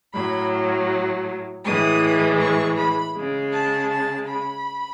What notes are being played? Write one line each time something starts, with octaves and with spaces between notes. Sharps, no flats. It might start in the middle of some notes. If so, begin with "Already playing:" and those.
A2 F#3 B5
A2 E3 G#3 D#6
C#6
B5
C#3 G#3
A5
A5
B5